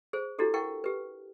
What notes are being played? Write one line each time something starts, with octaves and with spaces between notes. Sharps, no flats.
G#4 C5
D4 E4 F#4 G4 A4
E4 A#4 F#5 G5 C#6
G4 B4